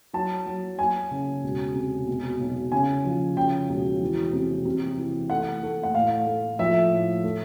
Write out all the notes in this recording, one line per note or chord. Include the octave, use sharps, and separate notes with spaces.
F#3 A5
F#3
F#3 G#5
C#3
E1
C3
B2
B1
C#3 G#5
F3
C#3 G5
E1
E3
C3
C3
E3
A3 F#5
A3
F#5
A2 F5
A3
F3 E5
A2
A3